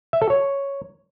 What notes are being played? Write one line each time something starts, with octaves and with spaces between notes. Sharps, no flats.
E5
A4
C#5